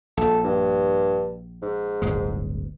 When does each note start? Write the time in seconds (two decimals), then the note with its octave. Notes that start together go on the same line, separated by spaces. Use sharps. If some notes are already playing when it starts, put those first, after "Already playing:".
0.17 A#1 A4
0.44 G2
1.62 G#2
2.02 D1 G1 G#3